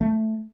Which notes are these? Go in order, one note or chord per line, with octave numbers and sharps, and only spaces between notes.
A3